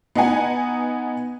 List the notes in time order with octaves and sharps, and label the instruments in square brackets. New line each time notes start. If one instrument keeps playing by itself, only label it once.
[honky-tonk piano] B3 D#4 D#5 F#5 G#5